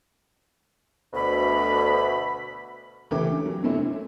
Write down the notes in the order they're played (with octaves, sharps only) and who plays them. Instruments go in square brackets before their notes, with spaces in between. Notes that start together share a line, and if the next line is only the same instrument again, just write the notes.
[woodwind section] D2 B2 B5
[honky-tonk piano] C#2 E3 A3 C#4 G4 D6
D3
F#3
G2 C3 A3 C4 C#4 E4
D3